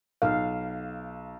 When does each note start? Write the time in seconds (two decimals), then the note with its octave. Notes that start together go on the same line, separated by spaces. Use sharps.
0.22 B1 F5